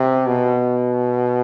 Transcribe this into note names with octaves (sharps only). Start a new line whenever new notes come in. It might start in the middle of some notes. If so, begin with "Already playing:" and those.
Already playing: C3
B2